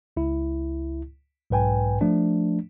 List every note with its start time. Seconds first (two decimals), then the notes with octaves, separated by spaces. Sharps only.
0.17 C#2 E4
1.50 B1 G#2 B4 G5 G#5
2.01 F3 A3 D4